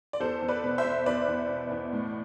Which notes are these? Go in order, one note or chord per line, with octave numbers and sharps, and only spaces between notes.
D5
E2 A4 C5
E2
B4 D5
B2
C5 E5
B2
E2 B4 D5
E2
B2
E2
A2